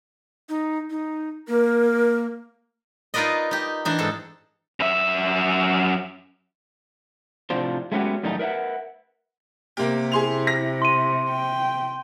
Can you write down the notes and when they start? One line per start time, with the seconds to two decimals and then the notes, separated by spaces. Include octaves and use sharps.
0.49 D#4
0.90 D#4
1.48 A#3 A#4
3.14 D#4 F4 A#4 B4 D5 D#5
3.51 D#4 G4
3.85 E3 D4 D#4
3.99 G#2 A4 A5
4.80 F#2 E5
7.50 A2 C3 F3 D4 F4 C5
7.92 G#3 A3 B3 C#4 F#4 G4
8.23 F#2 A2 D#3 G3 A3 D#4
8.39 A#4 B4 D#5 E5 F#5
9.77 C3 A#3 G4
10.12 E4 G#4 C6 F7
10.47 A#6
10.82 C6 D#7
11.29 G5